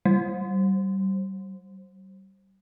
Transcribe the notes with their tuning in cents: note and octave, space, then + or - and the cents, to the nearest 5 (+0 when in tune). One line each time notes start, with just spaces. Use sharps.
G3 -30